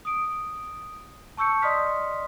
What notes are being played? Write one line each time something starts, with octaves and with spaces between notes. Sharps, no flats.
D#6 D7
A5 C#6 E6 G6 C#7
D5 D#5 C6 D#6 F6 B6